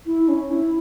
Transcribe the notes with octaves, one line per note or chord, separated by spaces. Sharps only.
E4
C#4
E4